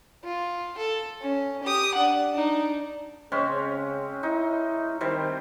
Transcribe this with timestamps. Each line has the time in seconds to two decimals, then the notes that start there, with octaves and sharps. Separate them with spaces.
0.24 F4
0.78 A4
1.21 C#4
1.63 G4 D#6
1.95 D4 F#5
2.33 D4 D#4
3.32 C#3 G#3 C4 C#4
4.23 D#4 E4
5.01 C3 D#3 G3 C4